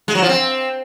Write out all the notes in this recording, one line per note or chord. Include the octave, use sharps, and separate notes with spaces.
G#3
F#3
F3
C4